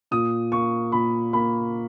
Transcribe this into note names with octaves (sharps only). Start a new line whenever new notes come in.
A#2 D#6
A#3 C#6
A#2 B5
A#3 B5